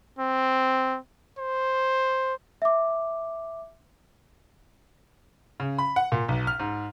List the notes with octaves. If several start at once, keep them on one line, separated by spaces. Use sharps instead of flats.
C4
C5
E5 D6
C#3
B5
F#5
A#2
B1
F6
G#2